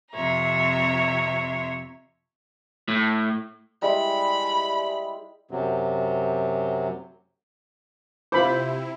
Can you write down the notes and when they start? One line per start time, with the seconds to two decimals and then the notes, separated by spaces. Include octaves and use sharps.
0.12 F2 C3 C#5 E5 A#5
2.88 A2
3.82 G3 G#3 E4 B5
5.51 F#2 C3 F#3
8.32 C3 E4 F4 C5 B5 D6